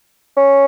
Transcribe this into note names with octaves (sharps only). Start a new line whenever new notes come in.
C#4